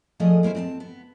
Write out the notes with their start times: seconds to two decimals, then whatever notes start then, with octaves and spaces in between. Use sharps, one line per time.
0.20 A#2 F3 A3 G#4 D#5
0.43 G#3 A#3 E4 C5
0.55 C4 D#5 A5
0.80 B3